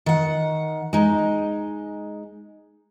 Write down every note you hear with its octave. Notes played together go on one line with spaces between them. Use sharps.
D#3 F#5
G#3 D#4